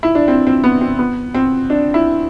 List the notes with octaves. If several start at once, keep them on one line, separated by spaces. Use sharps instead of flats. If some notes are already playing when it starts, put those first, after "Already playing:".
E4
D4
C4
C4
B3
C4
B3
C4
D4
E4